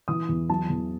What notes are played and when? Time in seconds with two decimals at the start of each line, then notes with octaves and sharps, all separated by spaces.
0.08 E3 D#6
0.29 E2
0.50 F#3 A5
0.70 E2